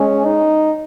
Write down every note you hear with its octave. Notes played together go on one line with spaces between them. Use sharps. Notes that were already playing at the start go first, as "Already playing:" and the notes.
Already playing: G#3 C#4
D#4